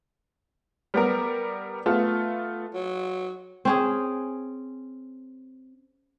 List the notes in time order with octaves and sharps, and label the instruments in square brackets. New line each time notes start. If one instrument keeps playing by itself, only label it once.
[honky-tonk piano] G3 B3 A#4
A3 B3 F4
[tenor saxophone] F#3
[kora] C4 C#4 G#4